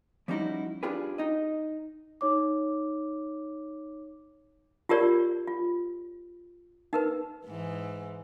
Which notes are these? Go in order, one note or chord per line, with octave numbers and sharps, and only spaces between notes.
F3 G3 C#4 D#4 E4 F#4
D4 F4 G4 G#4 B4
D#4 D#5
D#4 C#5 D6
F4 G4 A#4 C#5 D5
F4
D#4 A#4 B4
G#2 E3